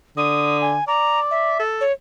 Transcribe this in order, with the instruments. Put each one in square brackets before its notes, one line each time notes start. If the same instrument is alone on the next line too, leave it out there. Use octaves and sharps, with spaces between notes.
[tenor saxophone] D3 [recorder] D#6
[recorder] G#5
[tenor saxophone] D5 [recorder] A#5
[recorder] E5
[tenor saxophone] A4
[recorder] C#5